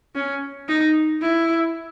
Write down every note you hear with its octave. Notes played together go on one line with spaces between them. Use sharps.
C#4
D#4
E4